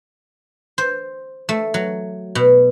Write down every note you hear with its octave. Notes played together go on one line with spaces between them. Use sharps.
C5
A3
F#3
B2